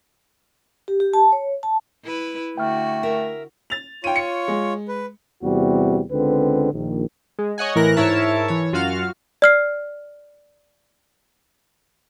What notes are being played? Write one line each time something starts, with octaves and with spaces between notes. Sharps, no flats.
G4
G4
A5
C#5
A5
E4 B4
D3 A3 E4 F#4 G5 F6
A#4 E5
A6 F7
F4 C#5 G5 C#6 D#7
C#7
G#3
B4
E2 C3 G3 F#4
C#2 D3 C4 B4
A#1 D#3
G#3
C#5 D#5 F#5 G#5
A2 E3 A#4 F#6 A#6
G#2 E4 A#4 C#5 E5 A5
E3 C#5
F#2 F4 F#4 F5 F6
D5 F6 C7